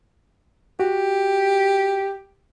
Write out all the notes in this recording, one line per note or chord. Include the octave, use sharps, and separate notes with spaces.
F#4 G4